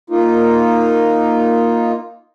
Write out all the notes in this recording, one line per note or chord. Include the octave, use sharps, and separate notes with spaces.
A#3 D#4 F4